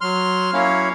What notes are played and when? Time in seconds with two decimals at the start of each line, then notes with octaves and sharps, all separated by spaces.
0.01 F#3 C6 F6
0.53 F#3 A#3 C#4 E4 C#5 F5